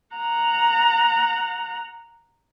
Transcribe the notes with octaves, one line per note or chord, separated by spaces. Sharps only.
F#5 A#5